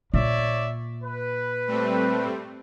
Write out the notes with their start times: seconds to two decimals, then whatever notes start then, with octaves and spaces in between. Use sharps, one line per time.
0.14 A#2 C#5 D5 E5
1.02 B4
1.68 G3 A3 C4